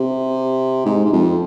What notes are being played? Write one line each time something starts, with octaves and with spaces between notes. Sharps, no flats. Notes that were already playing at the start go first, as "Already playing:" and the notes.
Already playing: C3
G#2
G#2
F2